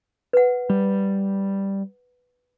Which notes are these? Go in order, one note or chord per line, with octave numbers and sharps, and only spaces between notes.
B4 F#5
G3